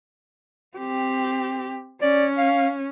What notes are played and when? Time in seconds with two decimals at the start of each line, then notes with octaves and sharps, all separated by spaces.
0.78 C4 G4
2.02 C#4 D5
2.38 F5